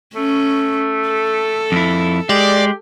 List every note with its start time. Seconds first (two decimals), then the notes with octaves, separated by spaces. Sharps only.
0.15 A3 C#4
1.09 A4
1.72 F2 E4
2.29 G#3 G4 D5